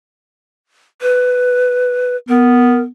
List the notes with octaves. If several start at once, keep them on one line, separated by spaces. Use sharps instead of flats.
B4
B3 A#4